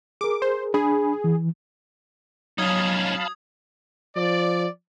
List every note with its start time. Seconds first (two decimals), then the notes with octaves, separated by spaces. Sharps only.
0.21 G#4 A#4 D6
0.42 C5
0.74 D4 G#4 G#5 B5
1.24 E3
2.58 F#3 C#4 D#4 F5 A5 B5 D#6 G#6
4.16 F3 D5